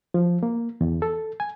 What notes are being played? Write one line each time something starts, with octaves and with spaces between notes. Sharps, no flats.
F3
A#3
E2
A4
G#5